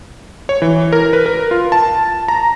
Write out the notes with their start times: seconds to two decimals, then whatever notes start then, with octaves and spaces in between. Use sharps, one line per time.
0.49 C#5
0.62 E3
0.93 A#4
1.13 B4
1.26 A#4
1.51 F4
1.72 A5
2.28 A#5